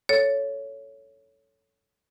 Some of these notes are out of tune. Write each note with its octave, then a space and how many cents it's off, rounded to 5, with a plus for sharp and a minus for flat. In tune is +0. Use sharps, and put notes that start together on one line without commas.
A4 +0 C#5 +10